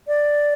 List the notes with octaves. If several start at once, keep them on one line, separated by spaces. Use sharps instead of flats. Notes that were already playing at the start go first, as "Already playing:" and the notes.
D5